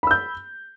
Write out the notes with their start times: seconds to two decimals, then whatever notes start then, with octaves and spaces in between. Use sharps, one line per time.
0.03 B5
0.07 E6
0.11 G6